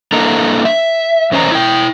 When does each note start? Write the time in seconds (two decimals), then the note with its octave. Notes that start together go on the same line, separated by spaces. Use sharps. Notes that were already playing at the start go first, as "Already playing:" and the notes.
0.12 A#3 D4 E4 A4 D#5 A#5
0.65 E5
1.31 E2 C#4 C5 D#5 A#5
1.52 E4 G5